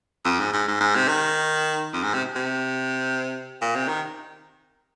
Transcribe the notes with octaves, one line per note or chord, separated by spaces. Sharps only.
F2
G#2
G#2
G#2
G#2
C3
D#3
F2
G#2
C3
C3
A#2
C3
D#3